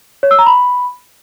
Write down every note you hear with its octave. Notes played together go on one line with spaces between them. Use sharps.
C#5
E6
A#5
B5